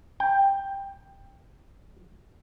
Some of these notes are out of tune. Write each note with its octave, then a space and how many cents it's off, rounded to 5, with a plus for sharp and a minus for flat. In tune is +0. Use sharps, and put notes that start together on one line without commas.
G5 +10